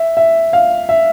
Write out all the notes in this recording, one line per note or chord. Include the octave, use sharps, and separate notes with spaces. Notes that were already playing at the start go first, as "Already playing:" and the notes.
Already playing: E5
E5
F5
E5